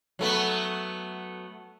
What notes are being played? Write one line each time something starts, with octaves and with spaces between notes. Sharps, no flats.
F#3 A3 B3